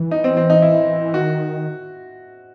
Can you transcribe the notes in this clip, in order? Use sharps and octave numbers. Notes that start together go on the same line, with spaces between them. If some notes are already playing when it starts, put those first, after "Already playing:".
Already playing: E3
D#4
C4
C4
D#4
E4
D#3 F#4